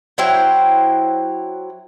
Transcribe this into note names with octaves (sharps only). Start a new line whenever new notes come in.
F#3 E4 C5 G5